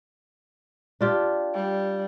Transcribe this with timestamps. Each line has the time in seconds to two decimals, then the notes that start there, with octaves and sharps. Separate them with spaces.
1.01 D4 F4 G4
1.54 G3